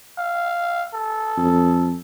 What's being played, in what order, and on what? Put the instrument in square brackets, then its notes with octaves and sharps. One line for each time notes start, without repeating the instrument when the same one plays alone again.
[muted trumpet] F5
A4
[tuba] F2